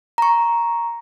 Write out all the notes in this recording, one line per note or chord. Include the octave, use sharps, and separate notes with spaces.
A#5 C#6